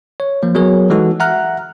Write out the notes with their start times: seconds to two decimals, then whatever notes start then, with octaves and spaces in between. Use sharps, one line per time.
0.20 C#5
0.43 F3 A#3
0.55 F#3 B3 F#4 G#4 A#4 C#5
0.90 E3 G#3 D#4 F#4 A4
1.20 E5 F#5 A#5 F6 F#6